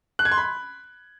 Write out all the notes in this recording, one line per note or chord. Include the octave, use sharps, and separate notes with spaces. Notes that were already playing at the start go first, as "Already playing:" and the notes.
F#6
G#6
C6
B5